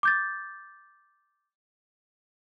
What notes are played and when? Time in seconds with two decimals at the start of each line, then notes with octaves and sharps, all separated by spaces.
0.03 D6 G6 A6